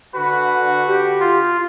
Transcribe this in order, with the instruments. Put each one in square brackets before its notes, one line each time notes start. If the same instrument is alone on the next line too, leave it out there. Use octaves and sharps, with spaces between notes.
[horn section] D3 F#4 [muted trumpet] B4
[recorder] G4
[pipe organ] F4